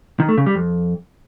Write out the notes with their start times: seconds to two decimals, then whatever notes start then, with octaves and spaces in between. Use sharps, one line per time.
0.20 D#3
0.29 A3
0.38 C#3
0.46 G3
0.55 F2